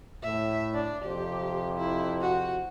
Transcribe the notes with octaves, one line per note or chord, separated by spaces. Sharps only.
A2 E5
D4
F2 C3 G4 C5
E4
F#4